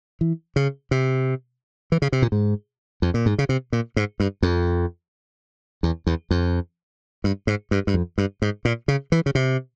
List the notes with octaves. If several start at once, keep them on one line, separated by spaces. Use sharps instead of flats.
E3
C#3
C3
E3
C#3
C3
A#2
G#2
F2
A#2
G#2
C#3
C3
A#2
G#2
G2
F2
E2
E2
F2
G2
G#2
G2
G2
F2
G2
G#2
A#2
C#3
E3
C#3
C3